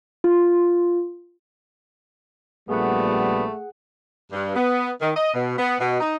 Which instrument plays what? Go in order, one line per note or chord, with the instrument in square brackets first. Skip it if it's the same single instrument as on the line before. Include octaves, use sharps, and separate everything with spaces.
[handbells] F4
[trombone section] A#1 A#2 G3 [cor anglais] A3 [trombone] B3 [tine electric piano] G#4 F#5
[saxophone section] G2
B3
D#3
D#5
B2
B3
B2
D#4